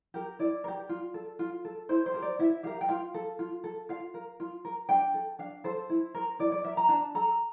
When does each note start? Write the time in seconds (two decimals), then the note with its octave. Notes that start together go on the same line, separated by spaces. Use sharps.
0.14 G4 A#4
0.39 E4 D5
0.64 A#4
0.68 G4
0.89 F4
1.14 A4
1.39 F4
1.65 A4
1.89 E4 C5
2.06 C5
2.14 G4 A#4
2.22 D5
2.39 E4 E5
2.63 G4 A#4 F5
2.81 G5
2.89 F4 F5
3.14 A4
3.39 F4
3.64 A4
3.89 F4 F5
4.14 A#4
4.40 F4
4.65 A#4
4.89 D4 G5
5.14 A4
5.39 D4 F5
5.64 A4 C5
5.89 E4
6.15 A#4
6.39 E4 D5
6.52 D5
6.64 A#4 E5
6.77 A#5
6.89 D4 A5
7.15 A4 A#5